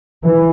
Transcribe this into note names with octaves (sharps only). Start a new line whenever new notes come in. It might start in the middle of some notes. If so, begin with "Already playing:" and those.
E3